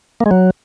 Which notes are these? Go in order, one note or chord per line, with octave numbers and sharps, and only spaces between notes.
A#3
G#3
F#3